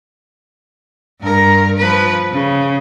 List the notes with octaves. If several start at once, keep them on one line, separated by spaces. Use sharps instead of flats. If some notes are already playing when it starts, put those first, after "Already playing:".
G2 A#4
F3 B4
C#3